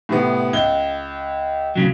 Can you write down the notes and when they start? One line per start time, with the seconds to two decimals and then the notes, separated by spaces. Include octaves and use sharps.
0.09 A2 C3 B3
0.53 C#2 G7
1.76 D2 C#3 F#3